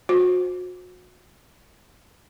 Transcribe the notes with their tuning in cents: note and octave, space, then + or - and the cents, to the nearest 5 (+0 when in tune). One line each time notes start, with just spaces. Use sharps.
F#4 -35 C5 +0